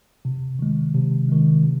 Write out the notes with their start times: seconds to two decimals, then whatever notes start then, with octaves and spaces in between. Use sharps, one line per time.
0.25 C3
0.59 D#3 G#3
0.95 C3
1.29 D#3 G#3
1.63 C3